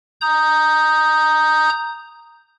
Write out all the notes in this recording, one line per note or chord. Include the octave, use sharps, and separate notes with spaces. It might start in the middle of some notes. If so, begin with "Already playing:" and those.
A#5 D#6 G6